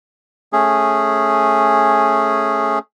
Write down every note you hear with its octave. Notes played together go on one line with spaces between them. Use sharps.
A3 C#4 G#4